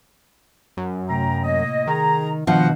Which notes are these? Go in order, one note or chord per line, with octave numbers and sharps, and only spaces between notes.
F#2
C3 A3 F#4 G5 A#5
A2 A#3 D#5
D#3 G#4 A#5
B2 D#3 F3 D4 D#5 F#5